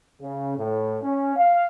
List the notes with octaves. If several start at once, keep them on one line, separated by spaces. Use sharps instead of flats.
C#3
A2
C#4
F5